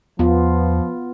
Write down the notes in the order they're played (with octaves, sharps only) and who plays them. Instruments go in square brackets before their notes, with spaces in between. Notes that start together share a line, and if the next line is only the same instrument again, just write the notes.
[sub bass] E2 [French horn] F3 [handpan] B3 F4